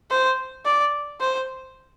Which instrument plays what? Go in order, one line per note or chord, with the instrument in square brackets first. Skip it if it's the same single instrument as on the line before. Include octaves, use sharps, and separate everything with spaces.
[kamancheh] C5
D5
C5